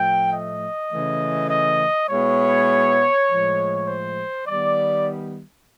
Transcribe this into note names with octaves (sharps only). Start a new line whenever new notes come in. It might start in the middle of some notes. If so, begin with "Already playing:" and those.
Already playing: A2 F3 A3 G5
D#5
C#3 E3 A3
D#5
B2 G#3 B3 E4 C#5
A2 F3 G#3
C5
D#3 G3 B3 D5